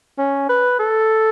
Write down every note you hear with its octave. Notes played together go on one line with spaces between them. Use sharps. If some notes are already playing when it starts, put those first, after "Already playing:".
C#4
B4
A4